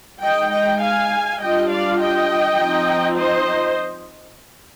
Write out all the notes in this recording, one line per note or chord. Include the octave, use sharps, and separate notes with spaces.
G#3 D#4 D#5 G5
D#5 G5
F5 G#5
G3 D4 F4 D#5 G5
D5 F5
D#5 G5
F3 C4 D#4
C5 D#5